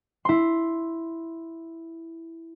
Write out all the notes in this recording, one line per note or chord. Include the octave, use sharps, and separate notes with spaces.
E4 C6